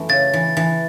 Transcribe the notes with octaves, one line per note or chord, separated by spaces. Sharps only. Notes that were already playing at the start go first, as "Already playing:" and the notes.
Already playing: F#2 E3 A3
C#3 A6
E3
E3